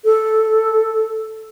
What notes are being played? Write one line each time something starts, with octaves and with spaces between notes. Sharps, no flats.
A4